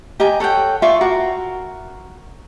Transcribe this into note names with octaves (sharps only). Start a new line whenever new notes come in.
G4 D#5 G#5 A#5
A4 C#5 F#5 G5
F4 D5 E5 C#6
F#4 A#4